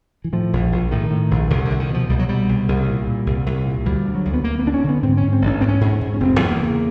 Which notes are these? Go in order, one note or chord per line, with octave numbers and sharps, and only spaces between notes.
E3
A2 F3
A#1
A#1
A2 D#3
A2
A#1
C2 D3
D3
C2
D#3
B2 F3
C2 G3
F#3
B2 G3
C2
C2
A#2
A#2
C2
C2
A#2
D2 G3
D3
F#3
D2
B3
D2 A#3
B3
D2 D4
C#4
D3 B3
G#2 C4
C#4
G#2
C4
A1
D4
C#4
G#2 C4
C#4
G#2
G#2
C#4
F1 C4
E2 B3
A#3
C#3